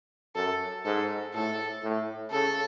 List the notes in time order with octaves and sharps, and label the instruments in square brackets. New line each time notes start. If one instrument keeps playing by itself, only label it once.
[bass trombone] F#2 [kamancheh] A4
[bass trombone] G#2 [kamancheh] A4
[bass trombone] A2 [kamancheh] A4
[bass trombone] A2
[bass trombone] C#3 [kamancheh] A4